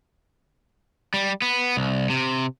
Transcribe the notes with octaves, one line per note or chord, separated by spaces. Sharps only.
G3
B3
C2
C3